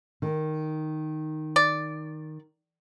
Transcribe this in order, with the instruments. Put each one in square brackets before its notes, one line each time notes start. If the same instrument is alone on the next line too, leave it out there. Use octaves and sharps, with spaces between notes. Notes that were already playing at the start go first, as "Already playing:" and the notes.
[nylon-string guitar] D#3
[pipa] D5